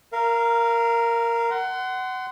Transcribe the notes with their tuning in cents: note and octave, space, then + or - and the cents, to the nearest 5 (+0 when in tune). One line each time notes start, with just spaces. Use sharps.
A#4 +0 F5 -25
F#5 +20 C6 -25